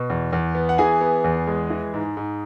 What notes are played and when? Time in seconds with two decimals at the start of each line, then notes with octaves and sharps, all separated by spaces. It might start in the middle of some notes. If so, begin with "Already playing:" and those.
Already playing: B2
0.10 E2
0.33 E2
0.55 B3
0.69 F#5
0.78 E3 G#4 G#5
1.01 B3
1.24 E2
1.47 G#3
1.70 E3
1.94 G#2
2.17 G#2